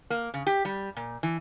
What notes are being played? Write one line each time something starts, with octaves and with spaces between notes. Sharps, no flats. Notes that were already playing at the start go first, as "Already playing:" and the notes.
A#3
C#3
G4
G3
A#2
E3